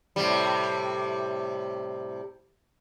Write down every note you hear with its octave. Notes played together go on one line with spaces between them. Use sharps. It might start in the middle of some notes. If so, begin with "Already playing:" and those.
A2 C3 G3